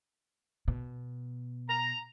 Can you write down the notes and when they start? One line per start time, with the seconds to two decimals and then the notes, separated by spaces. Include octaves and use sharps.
0.68 B2
1.69 A#5